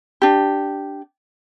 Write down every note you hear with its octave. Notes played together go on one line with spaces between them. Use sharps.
D4 G4